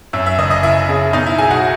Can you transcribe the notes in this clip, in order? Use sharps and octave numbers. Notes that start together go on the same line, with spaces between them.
F#2 E5 E6
E5 E6
F#1 D#5 D#6
D#5 D#6
F#1 E4 E5
C#3
B2 D#4 D#5
E4 E5
B1 G#4 G#5
F#4 F#5